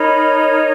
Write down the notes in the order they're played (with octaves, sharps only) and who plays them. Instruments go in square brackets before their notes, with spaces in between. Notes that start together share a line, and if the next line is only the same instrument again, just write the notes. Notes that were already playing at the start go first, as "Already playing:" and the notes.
Already playing: [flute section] D#4 A#4 C#5 B5